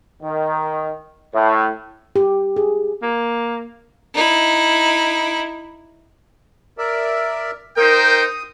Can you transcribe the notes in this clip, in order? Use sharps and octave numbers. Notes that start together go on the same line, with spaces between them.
D#3
A2
G4
G#4
A#3
D#4 E4
A#4 D5 E5
D#4 A#4 C5 G5 D#6